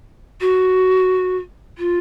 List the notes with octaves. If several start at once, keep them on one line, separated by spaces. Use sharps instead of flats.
F#4
F4